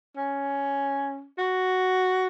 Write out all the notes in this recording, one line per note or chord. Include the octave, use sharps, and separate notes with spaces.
C#4
F#4